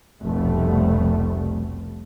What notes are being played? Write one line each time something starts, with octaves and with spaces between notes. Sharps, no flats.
F1 C2 F2 B2 G3 A3